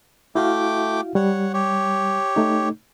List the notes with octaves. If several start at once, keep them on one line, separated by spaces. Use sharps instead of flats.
A3 E4 F#4 F5 G5 D6
G3 C#5 F#5
G4 C#5
A3 D#4